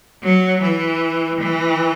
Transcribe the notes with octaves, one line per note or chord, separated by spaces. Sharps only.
F#3
E3
E3